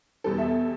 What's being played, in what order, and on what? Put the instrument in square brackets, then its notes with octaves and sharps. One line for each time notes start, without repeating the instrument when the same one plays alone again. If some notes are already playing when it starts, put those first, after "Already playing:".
[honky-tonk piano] E2 B2 G3 A4
E5